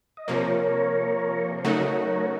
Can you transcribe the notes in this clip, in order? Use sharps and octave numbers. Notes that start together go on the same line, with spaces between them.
D#5
C3 F3 A#3 A#4 C#5
C5
C#3 F#3 A3 D#4 F#4 A#4 C#5